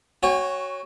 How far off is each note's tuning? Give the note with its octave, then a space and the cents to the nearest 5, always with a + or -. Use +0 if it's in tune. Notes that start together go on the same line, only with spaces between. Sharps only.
F#4 +10 C#5 +0 G#5 -45